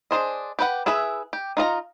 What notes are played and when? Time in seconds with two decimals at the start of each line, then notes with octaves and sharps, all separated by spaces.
0.11 D4 G#4 C5 D#5
0.59 G4 B4 F#5
0.86 E4 G#4 B4 E5
1.33 G4
1.57 D#4 F4 D#5 A#5